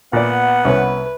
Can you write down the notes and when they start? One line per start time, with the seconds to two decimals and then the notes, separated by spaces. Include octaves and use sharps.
0.13 A#2 B3 D5 F#5
0.65 C2 C#4 B4